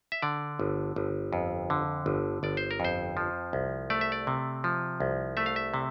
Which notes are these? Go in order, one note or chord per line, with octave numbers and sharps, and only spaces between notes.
E5
D3 D5
G1
G1
F2
D3
G1
G1 D5
C5
A#4
F2 C5
F3
C2
A3 D5
E5
D5
C3
F3
C2
A3 E5
F5
E5
C3